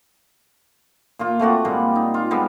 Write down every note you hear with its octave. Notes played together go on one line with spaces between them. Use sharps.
A#2 A#3 F4
A3 C4 F#4 D5
A#2 G3 G#3 A#3
D#4
F4
G3 G#3 B3